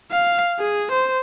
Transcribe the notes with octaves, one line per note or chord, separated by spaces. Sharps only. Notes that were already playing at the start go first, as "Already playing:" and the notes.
F5
G#4
C5